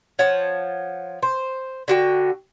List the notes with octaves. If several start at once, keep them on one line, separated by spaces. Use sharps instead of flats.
F3 C#5 F#5 A5
C5
D3 F#4 G5